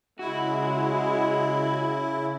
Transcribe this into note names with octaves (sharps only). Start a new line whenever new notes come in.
C#3 G#3 E4 F#4